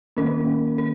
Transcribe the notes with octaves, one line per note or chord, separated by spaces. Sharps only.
D#3 A#3 C#4 A#4
A#4